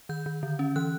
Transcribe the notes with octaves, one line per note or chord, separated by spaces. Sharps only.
D#3 G6
D#3
D3
C#4
E3 F#6